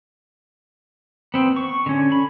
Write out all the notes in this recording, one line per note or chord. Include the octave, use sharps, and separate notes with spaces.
B3 C4
C#6
D3 C#4
B5